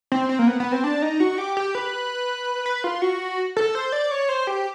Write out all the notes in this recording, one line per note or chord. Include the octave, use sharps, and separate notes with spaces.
C4
C4
A#3
B3
B3
C4
D4
D#4
F#4
G4
G4
B4
B4
F4
F#4
A4
C5
D5
C#5
C5
G4